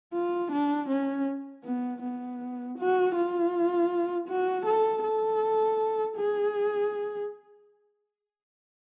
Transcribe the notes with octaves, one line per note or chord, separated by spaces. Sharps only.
F4
D4
C#4
B3
B3
F#4
F4
F#4
A4
A4
G#4